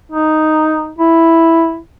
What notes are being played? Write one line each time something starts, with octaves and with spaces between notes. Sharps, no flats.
D#4
E4